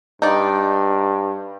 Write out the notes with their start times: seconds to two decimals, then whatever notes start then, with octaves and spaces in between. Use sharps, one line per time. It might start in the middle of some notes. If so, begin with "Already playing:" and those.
0.22 G2 D#4 D5